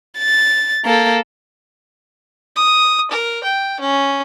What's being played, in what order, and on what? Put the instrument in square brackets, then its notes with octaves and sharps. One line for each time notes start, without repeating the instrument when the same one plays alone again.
[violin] A6
A#3 A4
[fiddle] D#6
A#4
G5
C#4